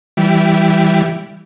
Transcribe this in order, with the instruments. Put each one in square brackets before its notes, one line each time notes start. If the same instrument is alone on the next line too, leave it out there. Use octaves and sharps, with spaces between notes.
[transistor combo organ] E3 G3